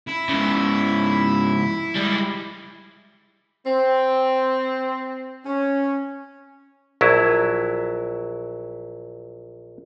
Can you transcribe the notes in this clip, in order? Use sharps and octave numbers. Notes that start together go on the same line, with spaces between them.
E4
G#2 C#3
G3 G#3
C4
C#4
A#1 F#3 E4